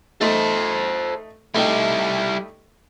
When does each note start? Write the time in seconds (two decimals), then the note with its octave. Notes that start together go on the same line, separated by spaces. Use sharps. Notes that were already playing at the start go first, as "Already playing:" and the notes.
0.21 A3 D#4 A4 C5
1.54 G3 A3 D#4 E4 G4